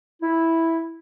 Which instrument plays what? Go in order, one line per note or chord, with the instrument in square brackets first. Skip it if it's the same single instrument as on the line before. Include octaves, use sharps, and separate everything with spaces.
[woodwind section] E4